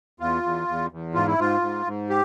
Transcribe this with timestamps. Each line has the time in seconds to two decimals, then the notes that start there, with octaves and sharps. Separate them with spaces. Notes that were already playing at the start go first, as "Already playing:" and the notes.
0.20 E2 F4
0.43 E2
0.68 E2
0.92 E2
1.14 G#2 F4
1.27 E4
1.38 G#2 F4
1.61 G#2
1.86 G#2
2.09 G4